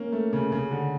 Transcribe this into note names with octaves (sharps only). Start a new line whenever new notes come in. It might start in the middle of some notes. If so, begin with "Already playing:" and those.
Already playing: A#3 C#4
A3
C#3
C#3
D3